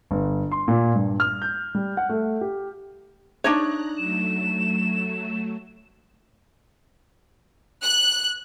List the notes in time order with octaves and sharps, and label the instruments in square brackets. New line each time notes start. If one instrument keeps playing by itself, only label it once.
[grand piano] G1
C6
A#2
G2
F6
G6
G3
F#5
A3
G4
[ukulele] D4 D#4 C#5 [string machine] A#5 F#6
[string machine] F#3 A3 [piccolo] E7
[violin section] F#6